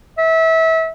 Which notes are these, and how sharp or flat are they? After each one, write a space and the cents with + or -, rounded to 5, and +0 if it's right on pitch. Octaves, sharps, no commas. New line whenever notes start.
E5 -25